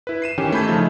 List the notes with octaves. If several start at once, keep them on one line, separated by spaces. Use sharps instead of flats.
E4 B4
C7 D#7 E7
D#3 E3 C#4 G4
A3 A4 B5 G6 G#6
C#3 F3 A3 D#4